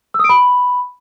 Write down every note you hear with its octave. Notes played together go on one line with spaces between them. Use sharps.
E6
D#6
D7
B5